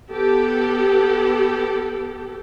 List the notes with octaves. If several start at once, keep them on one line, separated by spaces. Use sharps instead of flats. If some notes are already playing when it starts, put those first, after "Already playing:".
B3 G4 A4